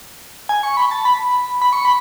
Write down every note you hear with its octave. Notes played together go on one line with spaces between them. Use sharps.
G#5
C#6
B5
A5
B5
B5
C#6
B5